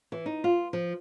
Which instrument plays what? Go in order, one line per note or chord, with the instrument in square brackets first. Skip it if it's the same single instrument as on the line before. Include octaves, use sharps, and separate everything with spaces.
[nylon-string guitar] E3
D#4
F4
F3